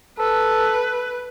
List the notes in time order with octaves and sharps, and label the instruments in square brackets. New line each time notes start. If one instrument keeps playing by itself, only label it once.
[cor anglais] A4 [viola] B4